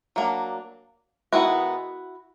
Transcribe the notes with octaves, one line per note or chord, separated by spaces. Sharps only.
F#3 A#3 D4
D#3 G#3 B3 E4 F#4